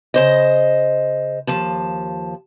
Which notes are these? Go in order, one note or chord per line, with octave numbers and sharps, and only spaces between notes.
C#3 C5 D#5
D#2 F3 A5